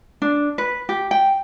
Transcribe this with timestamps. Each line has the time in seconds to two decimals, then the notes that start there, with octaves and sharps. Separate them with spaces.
0.22 D4
0.58 B4
0.89 G4
1.11 G5